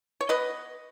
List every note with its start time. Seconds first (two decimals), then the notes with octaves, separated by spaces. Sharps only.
0.21 C#5
0.29 B3 B4 D#5